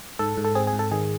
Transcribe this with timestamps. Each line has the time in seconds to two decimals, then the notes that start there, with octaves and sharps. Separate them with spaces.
0.19 G#2 A4
0.37 G#2
0.44 A4
0.55 C4 G#4
0.67 G#4
0.73 G#2
0.79 A4
0.91 D#3 G#4